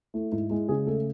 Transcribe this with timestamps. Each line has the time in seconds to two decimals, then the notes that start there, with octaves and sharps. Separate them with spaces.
0.14 A3 E4
0.32 G#2 E4
0.50 G#3 E4
0.69 C#3 G#4
0.86 A3 A4